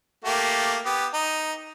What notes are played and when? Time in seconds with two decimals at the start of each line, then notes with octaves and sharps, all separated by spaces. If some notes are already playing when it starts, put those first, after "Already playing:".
0.25 A3 A#3 G4
0.85 B3 G4
1.14 D#4